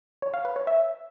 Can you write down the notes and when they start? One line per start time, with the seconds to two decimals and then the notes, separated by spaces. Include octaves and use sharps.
0.22 C#5
0.34 F5
0.45 B4
0.56 C#5
0.67 E5